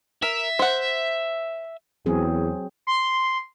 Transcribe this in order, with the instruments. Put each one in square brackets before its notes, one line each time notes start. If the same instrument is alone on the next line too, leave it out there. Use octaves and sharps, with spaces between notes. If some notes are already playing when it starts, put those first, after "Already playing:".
[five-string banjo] A#4 [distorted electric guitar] E5
[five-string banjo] C5 F#5
[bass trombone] E2 [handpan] F#3 C4 G#4
[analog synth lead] C6